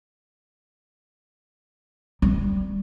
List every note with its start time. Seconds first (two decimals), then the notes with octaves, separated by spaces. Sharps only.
2.22 G3